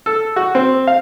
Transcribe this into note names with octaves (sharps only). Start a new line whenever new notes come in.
A4
F#4
C4
F5